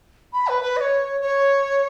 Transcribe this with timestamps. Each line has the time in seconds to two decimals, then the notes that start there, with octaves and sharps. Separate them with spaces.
0.33 B5
0.48 B4
0.62 B4
0.76 D#5
0.80 C#5
1.21 C#5